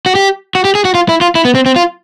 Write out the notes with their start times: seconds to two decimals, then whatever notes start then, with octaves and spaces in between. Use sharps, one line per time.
0.06 F#4
0.15 G4
0.55 F#4
0.65 G4
0.75 G#4
0.85 F#4
0.95 F4
1.09 E4
1.21 F4
1.35 E4
1.45 B3
1.55 C4
1.66 C4
1.76 F4